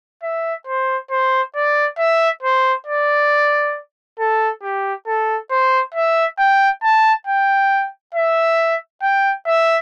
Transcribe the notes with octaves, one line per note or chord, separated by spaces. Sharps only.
E5
C5
C5
D5
E5
C5
D5
A4
G4
A4
C5
E5
G5
A5
G5
E5
G5
E5